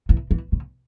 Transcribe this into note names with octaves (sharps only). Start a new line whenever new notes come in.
E3
E3
C#3